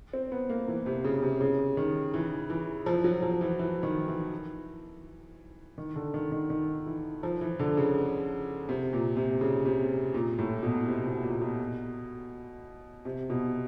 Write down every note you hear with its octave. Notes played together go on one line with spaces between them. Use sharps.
C4
B3
A#3
E3
C3
C#3
C3
C#3
D#3
E3
E3
F3
F#3
F3
E3
E3
D#3
E3
D#3
D3
D#3
D#3
D#3
E3
F3
E3
D3
C#3
C3
A#2
C3
C#3
C3
A#2
A2
B2
C3
B2
A#2
B2
C3
B2